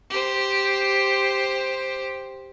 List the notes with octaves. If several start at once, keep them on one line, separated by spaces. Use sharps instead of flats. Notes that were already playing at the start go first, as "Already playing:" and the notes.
G4 C5